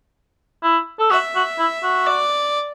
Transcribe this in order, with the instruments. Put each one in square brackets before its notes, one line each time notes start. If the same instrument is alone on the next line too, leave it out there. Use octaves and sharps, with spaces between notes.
[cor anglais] E4
A4
[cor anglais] F#4 [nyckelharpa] E5
[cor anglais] F#4
E4
F#4
[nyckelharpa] D5